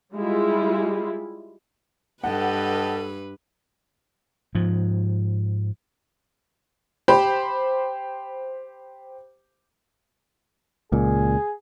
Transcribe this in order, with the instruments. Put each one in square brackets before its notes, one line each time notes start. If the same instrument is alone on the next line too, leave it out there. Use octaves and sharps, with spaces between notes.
[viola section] G3 G#3 E4 F4
[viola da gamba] G2 B4 [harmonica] G4 D#5 A5 [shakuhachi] A4 [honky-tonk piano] F#5
[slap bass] G#2 F3
[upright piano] G4 C5 B5
[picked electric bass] C#2 A#2 [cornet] G#4